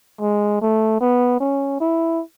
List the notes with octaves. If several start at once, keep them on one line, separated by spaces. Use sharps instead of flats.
G#3
A3
B3
C#4
E4